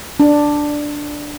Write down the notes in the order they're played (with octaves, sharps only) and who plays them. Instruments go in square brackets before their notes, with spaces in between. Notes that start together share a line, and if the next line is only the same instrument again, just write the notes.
[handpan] D4